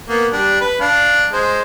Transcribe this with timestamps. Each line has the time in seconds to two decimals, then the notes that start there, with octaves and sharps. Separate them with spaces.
0.09 A#3 B3
0.32 G3 D4
0.61 B4
0.81 D4 F5
1.33 G#3 C5